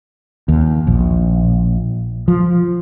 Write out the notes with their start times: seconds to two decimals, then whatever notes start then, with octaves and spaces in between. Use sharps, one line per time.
0.48 D#2
0.87 A#1
2.28 F3